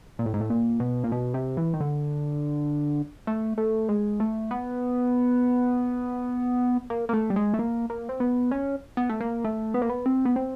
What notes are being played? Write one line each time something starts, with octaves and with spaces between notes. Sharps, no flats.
A#2
A2
G#2
A2
A#2
B2
A#2
B2
C3
E3
D#3
D3
A3
A3
G#3
A3
B3
A#3
A#3
A3
G3
G#3
A3
A#3
A#3
C4
B3
C#4
B3
A3
A#3
A3
B3
A#3
B3
C4
B3
C4